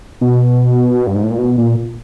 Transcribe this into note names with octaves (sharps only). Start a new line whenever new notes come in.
B2
G2
G#2
A2
A#2
B2
A#2